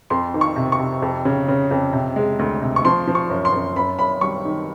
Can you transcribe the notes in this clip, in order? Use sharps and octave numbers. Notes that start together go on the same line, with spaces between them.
F2 C6
D#3
C#6
C3
C#6
C3
F2
C#3
C#3
F2
C3
G#3
D2
C3
C#6
F3 C6
F3
C#6
F#2
C6
F#2
F#2 B5
F#2 B5
G3 C#6
D#3